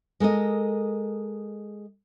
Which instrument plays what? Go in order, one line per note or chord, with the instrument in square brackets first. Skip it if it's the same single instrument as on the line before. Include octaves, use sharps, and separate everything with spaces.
[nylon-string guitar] G#3 A4 A#4 D#5